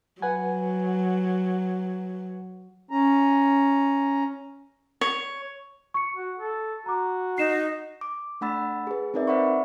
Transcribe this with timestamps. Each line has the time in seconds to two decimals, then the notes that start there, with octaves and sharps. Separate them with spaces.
0.22 F#3 B4 F#5 G#5
2.91 C#4 A#5
5.01 C#5
5.94 C#6 C#7
6.16 F#4
6.38 A4
6.86 F#4 A#5 D6
7.38 D#4 C7 E7
8.01 D6
8.41 A3 D4 F#5 B5 E6 A6
8.87 G#4 B4
9.14 C4 D#4 A#4 B4 D5 E5
9.27 C5 D5 E5 F#5 B5 C#6